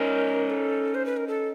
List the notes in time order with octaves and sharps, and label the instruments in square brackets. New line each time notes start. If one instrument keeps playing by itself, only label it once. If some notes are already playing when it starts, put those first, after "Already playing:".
Already playing: [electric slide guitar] C#4 D#4 [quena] A#4
[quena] A4
C5
B4
A#4
A4